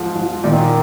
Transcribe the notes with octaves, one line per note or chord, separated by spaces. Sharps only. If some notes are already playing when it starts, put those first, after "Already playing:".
Already playing: G#2 F3
F3
A#2 D#3